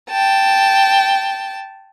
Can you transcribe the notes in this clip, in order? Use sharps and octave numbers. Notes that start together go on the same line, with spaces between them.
G5 A5